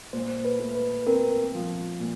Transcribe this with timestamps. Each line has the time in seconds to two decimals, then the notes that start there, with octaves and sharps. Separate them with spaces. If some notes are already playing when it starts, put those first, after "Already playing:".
0.13 A#2 C5
0.45 B4
0.59 A3
0.75 B4
1.07 C4 A#4
1.54 F3
2.00 A#2